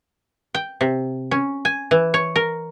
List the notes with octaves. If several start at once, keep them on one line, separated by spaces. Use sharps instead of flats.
G5
C3
C#4
G#5
E3
C#5
A#4